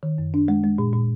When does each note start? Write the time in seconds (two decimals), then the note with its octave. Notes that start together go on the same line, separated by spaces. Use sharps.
0.03 D#3
0.18 F#2
0.34 D4
0.48 G#3
0.64 G#3
0.78 A#2
0.93 A#2